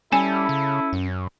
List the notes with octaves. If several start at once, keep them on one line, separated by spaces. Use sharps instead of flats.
G3 C#4 E4 A4 G#5
C#3
F#2